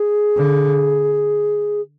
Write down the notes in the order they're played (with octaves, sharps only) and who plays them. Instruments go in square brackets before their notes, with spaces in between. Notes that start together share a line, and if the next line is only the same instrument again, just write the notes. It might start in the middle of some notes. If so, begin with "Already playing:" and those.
Already playing: [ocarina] G#4
[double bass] D3